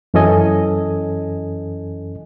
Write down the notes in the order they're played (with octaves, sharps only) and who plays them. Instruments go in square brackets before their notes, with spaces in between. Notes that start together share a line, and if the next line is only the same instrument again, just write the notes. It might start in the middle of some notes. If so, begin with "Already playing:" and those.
[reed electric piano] F#2 E3 C#4 A4 D#5 G#5